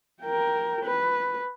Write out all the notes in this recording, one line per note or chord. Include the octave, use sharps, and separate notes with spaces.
A#4 G5
B4